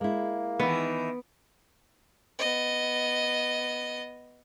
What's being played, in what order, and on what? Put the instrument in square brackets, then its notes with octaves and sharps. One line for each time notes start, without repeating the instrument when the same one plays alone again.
[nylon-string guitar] G#3 E4 [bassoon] A#3
[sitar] D#3 E3 [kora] B3
[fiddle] B3 D#5